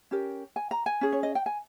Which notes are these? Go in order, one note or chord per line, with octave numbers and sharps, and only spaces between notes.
C#4 G4 A#4
G#5
A#5
G#5
C#4 G#4
C#5
D#5
G5
G#5